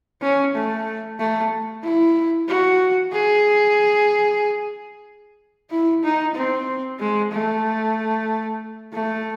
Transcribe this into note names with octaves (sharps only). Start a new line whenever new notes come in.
C#4
A3
A3
E4
F#4
G#4
E4
D#4
C4
G#3
A3
A3